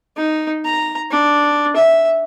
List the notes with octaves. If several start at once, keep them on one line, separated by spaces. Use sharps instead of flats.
D#4
A#5
D4
E5